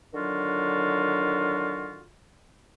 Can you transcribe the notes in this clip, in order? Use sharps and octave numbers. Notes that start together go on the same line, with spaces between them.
D3 D#3 F#3 D4 F4 F#4